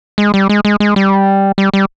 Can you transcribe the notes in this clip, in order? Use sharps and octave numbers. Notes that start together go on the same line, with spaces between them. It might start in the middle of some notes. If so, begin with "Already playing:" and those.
G#3
G3
G#3
G#3
G#3
G3
G3
G3